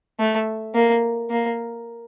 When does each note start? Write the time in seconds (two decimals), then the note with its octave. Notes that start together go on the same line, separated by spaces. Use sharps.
0.19 A3
0.75 A#3
1.31 A#3